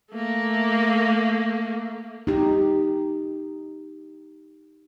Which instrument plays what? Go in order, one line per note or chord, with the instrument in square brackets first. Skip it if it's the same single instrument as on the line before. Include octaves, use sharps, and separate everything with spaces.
[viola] A3 A#3
[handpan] D#4 G4